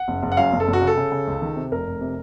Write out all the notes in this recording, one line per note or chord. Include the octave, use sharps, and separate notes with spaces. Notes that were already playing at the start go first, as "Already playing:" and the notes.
Already playing: F#5
F#1
F#1
F#5
F#2 F5
F#1
A4
F#1
F#4
C#3
A4
C#3
C#3
C#2
D#3
C3
F1 A#4
F1
C3